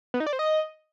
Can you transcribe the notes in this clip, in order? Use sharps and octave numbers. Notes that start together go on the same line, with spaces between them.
B3
D#4
D5
C5
D#5